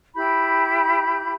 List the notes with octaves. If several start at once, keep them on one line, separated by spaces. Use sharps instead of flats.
E4 G4 B5 G6